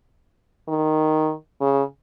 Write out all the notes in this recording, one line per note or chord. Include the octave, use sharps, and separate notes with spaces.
D#3
C#3